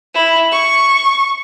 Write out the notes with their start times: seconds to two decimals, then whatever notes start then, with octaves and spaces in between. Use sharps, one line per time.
0.15 E4
0.52 C#6